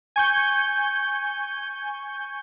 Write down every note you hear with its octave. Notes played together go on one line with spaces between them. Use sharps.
G#5 C#6 G6